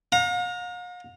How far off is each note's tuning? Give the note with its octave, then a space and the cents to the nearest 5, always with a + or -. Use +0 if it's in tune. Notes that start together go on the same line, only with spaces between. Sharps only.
F5 +45 A#5 -5